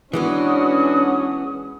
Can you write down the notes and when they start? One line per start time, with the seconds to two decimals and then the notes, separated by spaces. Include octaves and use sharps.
0.13 E3 G#3 B3 C#4 D4 F#4 D#6